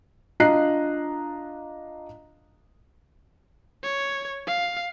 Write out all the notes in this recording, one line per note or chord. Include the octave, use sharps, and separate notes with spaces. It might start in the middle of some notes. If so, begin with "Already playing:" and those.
D4 F4 D#5 A#5 F#6 C7
C#5
F5